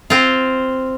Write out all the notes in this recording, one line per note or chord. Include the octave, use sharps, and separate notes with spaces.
C4 F4